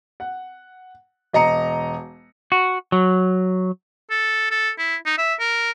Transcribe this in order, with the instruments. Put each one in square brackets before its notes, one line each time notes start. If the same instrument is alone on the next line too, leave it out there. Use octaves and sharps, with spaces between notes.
[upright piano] F#5
E1 D#5 A#5 C#7
[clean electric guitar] F#4
F#3
[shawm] A4
A4
E4
D#4
E5
A#4